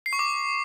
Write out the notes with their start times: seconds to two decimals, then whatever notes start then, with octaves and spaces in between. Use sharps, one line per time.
0.06 C7
0.13 C#6
0.19 D6